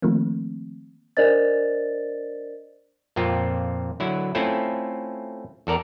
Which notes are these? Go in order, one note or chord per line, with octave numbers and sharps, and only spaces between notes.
D#3 F3 A3 A#3 C4
D4 A#4 C5 D5 D#5 A6
F2 A#2 C4 F4
D3 F#3 E4
A3 C4 C#4 E4 F4 A4
E2 A4 A#4 D5 A#5